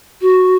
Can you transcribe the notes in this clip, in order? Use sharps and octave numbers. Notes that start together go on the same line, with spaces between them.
F#4